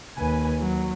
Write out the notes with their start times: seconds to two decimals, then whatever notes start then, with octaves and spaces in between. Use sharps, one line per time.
0.18 D#2 B4 G#5
0.62 F#3